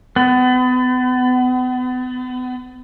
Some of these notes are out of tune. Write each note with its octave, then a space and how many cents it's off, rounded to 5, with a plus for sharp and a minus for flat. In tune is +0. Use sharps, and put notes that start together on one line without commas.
B3 +35